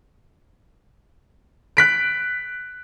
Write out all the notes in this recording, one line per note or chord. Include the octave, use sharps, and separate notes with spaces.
F#6 B6 D7